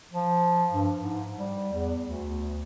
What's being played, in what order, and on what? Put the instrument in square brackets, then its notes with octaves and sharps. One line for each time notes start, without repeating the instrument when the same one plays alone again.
[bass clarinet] F3
G2
G#2
G3
E2
D2